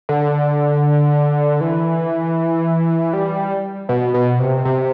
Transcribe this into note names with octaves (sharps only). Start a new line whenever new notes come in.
D3
E3
G3
B2
B2
C3
C3